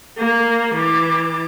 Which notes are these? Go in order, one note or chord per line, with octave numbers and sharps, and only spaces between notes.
A#3
E3 D6